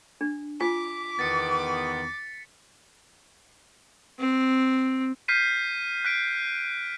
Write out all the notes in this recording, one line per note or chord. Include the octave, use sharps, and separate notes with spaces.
D4
F4 G#5 D6 B6
E2 D#3 B3 A6 C#7
C4
F6 G6 B6 C7 D#7
F#6 B6 D7